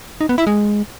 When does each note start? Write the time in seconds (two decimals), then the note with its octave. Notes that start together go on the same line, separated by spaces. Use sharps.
0.21 D#4
0.29 B3
0.38 E4
0.47 G#3